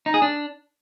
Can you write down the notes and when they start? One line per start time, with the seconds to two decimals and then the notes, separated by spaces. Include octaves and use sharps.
0.06 D#4
0.14 G#4
0.22 D4